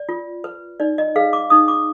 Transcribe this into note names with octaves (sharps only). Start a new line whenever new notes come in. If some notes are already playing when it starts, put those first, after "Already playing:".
Already playing: D5
F4
B4
D#4 D5
D#5
G#4 B4 F5
D6
D#4 D#6
D6